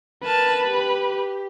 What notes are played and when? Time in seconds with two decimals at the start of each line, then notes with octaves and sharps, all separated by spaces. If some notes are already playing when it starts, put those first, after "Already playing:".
0.23 A#4 B4 A5
0.64 G4